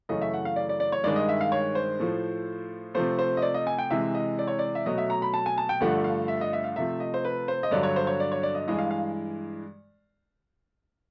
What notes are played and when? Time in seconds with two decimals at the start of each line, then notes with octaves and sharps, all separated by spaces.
0.09 F#2 C#3 E3 A3 D#5
0.22 E5
0.33 F#5
0.45 F5
0.56 D5
0.69 D5
0.80 D5
0.92 C#5
1.04 G2 D#3 G#3 D5
1.16 D#5
1.29 E5
1.41 F5
1.52 C#5
1.75 C5
2.00 A2 F3 A3
2.95 C3 F3 A3 C5
3.19 C5
3.37 D#5
3.42 D5
3.54 D#5
3.67 G#5
3.78 G5
3.91 C3 E3 G#3 E5
4.15 D#5
4.39 D5
4.48 C#5
4.59 D5
4.75 E5
4.86 B2 F#3 A3 D#5
4.98 E5
5.10 A#5
5.22 B5
5.34 A5
5.46 G#5
5.58 A5
5.69 G5
5.80 G2 D3 F3 A3 F#5
6.04 F5
6.28 E5
6.41 D#5
6.53 E5
6.64 F5
6.76 C3 F3 A3 E5
7.00 D#5
7.14 C5
7.25 B4
7.48 C5
7.63 D#5
7.71 G2 D3 F#3 D5
7.83 C#5
7.96 C5
8.07 C#5
8.20 D5
8.32 C#5
8.43 D5
8.55 D#5
8.67 G2 E3 G#3 D#5
8.79 F5
8.91 F5